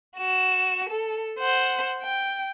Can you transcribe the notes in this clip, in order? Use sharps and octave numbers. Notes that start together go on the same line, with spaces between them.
F#4 E7
A4
C5 F#5
G5